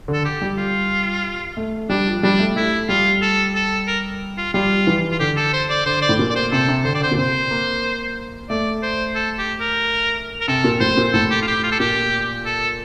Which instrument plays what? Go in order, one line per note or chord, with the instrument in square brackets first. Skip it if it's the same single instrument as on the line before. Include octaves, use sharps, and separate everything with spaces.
[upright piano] D3
[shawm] A4
G4
[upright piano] G3
[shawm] F4
[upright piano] A3
[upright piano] G3 [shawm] D4
[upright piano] F3
[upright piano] G3 [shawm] D4
[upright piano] A3
[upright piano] A3 [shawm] E4
[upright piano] G3 [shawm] F4
[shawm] A4
A4
A#4
F4
[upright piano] G3 [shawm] F4
[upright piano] E3
[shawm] F4
[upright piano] D3 [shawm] G4
[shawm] A4
C5
D5
[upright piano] D3 [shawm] C5
[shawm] D5
[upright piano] A2
A#2
[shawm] D5
C5
[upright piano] C3 [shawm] A4
[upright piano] C3
[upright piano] D3 [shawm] C5
[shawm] D5
[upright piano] D3 [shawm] C5
[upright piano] A#2
[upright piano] C3 [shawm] C5
[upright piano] A#3
[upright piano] A3 [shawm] D5
[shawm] C5
A4
G4
A#4
A#4
[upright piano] C3 [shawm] A4
[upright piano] A#2
[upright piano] A2 [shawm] C5
[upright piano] A#2
[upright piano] A2 [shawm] A4
[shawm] G4
F4
G4
F4
A4
[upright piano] A#2 [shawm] G4
[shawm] A4